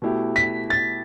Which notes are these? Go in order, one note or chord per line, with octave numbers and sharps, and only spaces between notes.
B2 A3 E4 G4
B6
A6